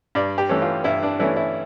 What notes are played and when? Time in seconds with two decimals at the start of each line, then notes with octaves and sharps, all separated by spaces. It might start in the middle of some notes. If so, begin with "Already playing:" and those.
0.15 G2 D5
0.38 G4
0.49 E3 A3 C#4
0.62 F4
0.84 G2 E4
1.03 D4
1.19 E3 A3 C#4 E4
1.36 E4